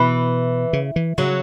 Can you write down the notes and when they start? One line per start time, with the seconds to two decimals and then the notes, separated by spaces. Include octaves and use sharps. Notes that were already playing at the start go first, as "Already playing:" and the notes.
Already playing: B2 E3
0.73 C#3
0.96 E3
1.18 C#3 F#3